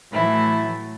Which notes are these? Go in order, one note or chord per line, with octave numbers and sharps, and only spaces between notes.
A2 E3 F#3 A3 E4